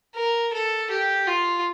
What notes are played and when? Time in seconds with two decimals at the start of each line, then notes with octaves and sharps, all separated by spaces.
0.15 A#4
0.53 A4
0.90 G4
1.27 F4